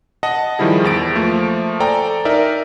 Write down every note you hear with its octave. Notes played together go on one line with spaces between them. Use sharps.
D#5 F#5 A5
D#3 F3 G3 E4 G#4
E2 A6 D7
F3 A3 A#3
A4 C5 D5 G5 G#5 A#5
D#4 A#4 D5 E5